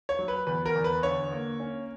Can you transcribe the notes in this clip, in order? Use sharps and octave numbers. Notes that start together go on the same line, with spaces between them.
C#5
F#3
B4
E2 B4
A#4
E2
B4
D3 C#5
A#3
C#4